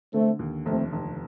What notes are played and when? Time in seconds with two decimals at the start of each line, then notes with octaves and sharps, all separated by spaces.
0.13 D3 A3 C4
0.39 D#2
0.66 F1 A3 C4
0.92 F1